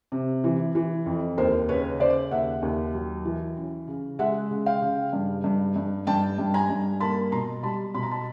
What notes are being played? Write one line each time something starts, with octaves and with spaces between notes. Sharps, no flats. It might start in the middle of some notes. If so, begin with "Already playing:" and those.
C3
E3
E3
F2
D#2 A#4 C5
C#3 B4 C#5
C#3 C5 D5
D#2 E5 F#5
D#2
F#3
E3
C#4
C#3
G#3 E5 F#5
C#3
F5 G5
C#3
G2
G2
G2
G2 G5 A5
G2
G#5 A#5
G2
A#3 A5 B5
B2 A#5 C6
G3 A5 B5
B2 B5
A#5
A5 B5